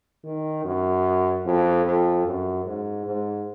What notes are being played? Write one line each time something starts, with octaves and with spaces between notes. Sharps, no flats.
D#3
F#2
F2
F2
F#2
G#2
G#2